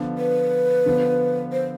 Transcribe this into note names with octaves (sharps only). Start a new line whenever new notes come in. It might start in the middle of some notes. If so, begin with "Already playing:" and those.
Already playing: D3 F3 B3 D4
B4
D3 F3 B3 D4
C5